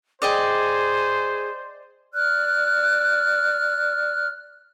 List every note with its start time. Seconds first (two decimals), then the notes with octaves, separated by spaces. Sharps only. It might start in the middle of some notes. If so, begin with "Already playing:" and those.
0.22 G#4 C5 D5 D#5 G5
2.13 D5 F6 F#6